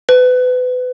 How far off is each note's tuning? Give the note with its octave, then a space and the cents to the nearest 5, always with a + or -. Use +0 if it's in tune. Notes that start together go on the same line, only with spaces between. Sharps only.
B4 +30